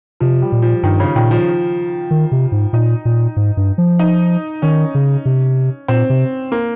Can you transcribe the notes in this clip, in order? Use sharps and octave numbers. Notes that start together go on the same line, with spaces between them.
C3 F3
G3
A#2
F3
G2 D#3
C#3
A#2 D#3
F3
D#3
C3
G#2
A#2 D#4
A#2
G#2
G2
F3
D#4
D#3 C#4
C#3
C3
A#2 C4
C3
A#3